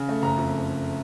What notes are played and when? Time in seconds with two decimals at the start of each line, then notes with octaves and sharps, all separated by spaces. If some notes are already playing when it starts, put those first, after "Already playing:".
Already playing: C#3
0.09 A3
0.22 F#1 A#5
0.37 F2